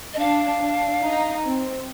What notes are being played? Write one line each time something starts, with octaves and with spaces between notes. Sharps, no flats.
D#5
D4 F5
D4
D#4
C4